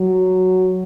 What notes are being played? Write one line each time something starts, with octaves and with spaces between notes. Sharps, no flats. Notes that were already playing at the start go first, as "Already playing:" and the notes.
Already playing: F#3